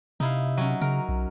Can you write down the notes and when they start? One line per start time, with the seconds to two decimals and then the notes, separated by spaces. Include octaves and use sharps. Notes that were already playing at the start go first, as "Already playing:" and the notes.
0.20 C3 D#4 E4 F5
0.57 F#3 C#4
0.81 C#3 A#4
1.09 B1